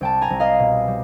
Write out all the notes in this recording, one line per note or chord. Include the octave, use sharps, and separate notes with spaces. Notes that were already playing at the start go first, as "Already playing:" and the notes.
C2 G5 A5
G#5 A#5
C2
D#5 F5
B2
G3